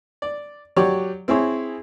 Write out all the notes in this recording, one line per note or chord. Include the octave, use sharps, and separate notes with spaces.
D5
F#3 G4 C#5 D5
C4 E4 G#4 C#5